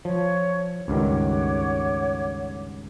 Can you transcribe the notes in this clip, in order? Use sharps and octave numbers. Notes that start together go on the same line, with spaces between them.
F3 C#5
C#2 G2 D#3 C#5 F#5 D6